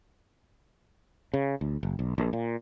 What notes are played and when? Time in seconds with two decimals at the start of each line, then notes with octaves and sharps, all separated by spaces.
1.34 C#3
1.61 D2
1.83 F#1
1.99 B1
2.18 A#1
2.33 A#2